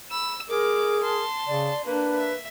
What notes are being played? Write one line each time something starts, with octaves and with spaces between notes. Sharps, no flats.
B5 E6
G#3 G#4 A#4 D6
A5 C6
C#3 D5
A#3 D4 B4
E5